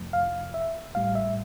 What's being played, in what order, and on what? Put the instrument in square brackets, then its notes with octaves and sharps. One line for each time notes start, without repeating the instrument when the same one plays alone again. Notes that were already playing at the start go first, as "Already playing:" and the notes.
Already playing: [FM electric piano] F2 C3 F3 A3
F5
E5
A1 A2 G3 F5
E5